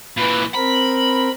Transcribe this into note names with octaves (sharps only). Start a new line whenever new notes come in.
A#2 E3 B4
C4 A#4 B5